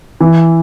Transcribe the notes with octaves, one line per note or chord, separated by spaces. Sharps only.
E3